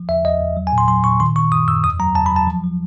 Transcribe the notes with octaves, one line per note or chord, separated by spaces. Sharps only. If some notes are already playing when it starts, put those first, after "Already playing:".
Already playing: F3
E2 E5
E2 D#5
E2
F#3
G#5
A#2
C6
F#3 C6
A#2 C#6
D#3 C6
D#3 C#6
F#2 D#6
F#2 E6
E2 D#6
F#3 A#5
E2 A5
B5
F#3
A5
F3
F3